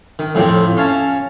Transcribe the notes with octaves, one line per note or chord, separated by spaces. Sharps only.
D#3
F2 A2 C3 F3 C4
C#4 F5 A5